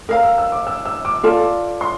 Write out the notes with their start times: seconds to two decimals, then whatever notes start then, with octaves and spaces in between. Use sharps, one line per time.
0.09 A#4 F5 A#5 E6
0.23 E6
0.38 E6
0.52 D6
0.67 E6
0.85 E6
1.05 D6
1.23 F4 A4 D5 A5
1.81 C6